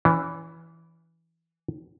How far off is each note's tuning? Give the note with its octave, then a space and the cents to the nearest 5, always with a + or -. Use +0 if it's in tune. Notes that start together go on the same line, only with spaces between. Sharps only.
E3 +0 C#4 +40